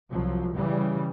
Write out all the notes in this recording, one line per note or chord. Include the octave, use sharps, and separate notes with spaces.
C2 F3 F#3
C#3 E3 G3